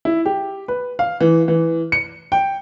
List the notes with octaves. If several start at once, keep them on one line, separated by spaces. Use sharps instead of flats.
E4
G4
B4
F5
E3
E3
C#7
G5